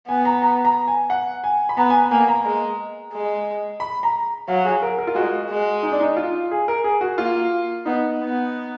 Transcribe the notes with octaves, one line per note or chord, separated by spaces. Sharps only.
B3 G#5
A#5
A#5
A#5
G#5
F#5
G#5
B5
B3 A#5
G#5
A#5
A#3 G#5
A#5
G#3
G#3
B5
A#5
F#3 F5
G#4
A#4
A#4
F4
G#3 F#4
G#3
D#4
D4
D#4
F4
G#4
A#4
G#4
F#4
A#3 F4
B3 D#4
B3